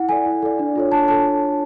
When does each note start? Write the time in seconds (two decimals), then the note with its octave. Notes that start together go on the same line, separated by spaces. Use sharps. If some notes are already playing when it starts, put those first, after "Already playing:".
Already playing: E4 F#5
0.09 A4 D5 G#5
0.26 E4
0.42 A4 D5
0.59 D4
0.76 F4 A4 C#5
0.92 D4 A5
1.08 F4 A4 A5